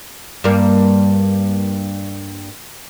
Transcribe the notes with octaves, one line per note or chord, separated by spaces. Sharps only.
G2 A#3